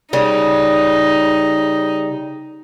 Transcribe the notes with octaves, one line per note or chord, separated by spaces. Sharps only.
C#3 G3 D#4